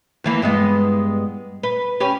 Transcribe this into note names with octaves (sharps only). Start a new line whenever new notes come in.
D#2 E3 A#3
G2 G#3 B3
B4
C#4 G4 B4